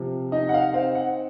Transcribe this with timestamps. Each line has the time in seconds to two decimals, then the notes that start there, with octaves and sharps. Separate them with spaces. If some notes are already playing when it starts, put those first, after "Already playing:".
Already playing: C3 F3
0.32 D#4 D#5
0.49 F#5
0.54 F5
0.74 C4 F5
0.95 F#5